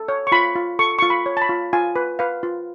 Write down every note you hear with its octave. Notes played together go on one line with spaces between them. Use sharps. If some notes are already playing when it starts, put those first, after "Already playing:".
Already playing: A4
C#5
C#6
F4 B5
F4
A4 C#6
F4 C#6
B5
C#5
A5
B5
F4
F4 G#5
B4
B4 F5
F4